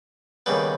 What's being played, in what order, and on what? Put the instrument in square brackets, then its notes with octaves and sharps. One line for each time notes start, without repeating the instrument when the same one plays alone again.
[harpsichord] D#2 C#3 G3 B3